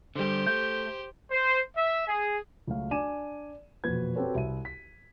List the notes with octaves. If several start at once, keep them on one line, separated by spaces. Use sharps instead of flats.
D3 G3 G4 C5
A3 G6
C5
E5
G#4
C#2 F#3 A3 F#4 F5
D4 D5 G#5 D6 D#7 E7
E1 F2 A#2 F#4 B4 G#6
C4 F#4 G4 A4 B4 C#5
C2 E5 D#7
B6